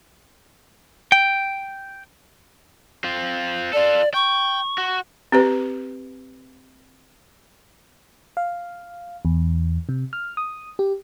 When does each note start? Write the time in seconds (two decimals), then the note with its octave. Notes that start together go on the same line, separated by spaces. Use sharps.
1.12 G5
3.04 C4 F4
3.73 F4 A4 D5
4.14 G5 C#6
4.78 F#4
5.32 C4 G4 B4
8.37 F5
9.25 E2
9.89 C3
10.13 F6
10.37 D#6
10.79 G4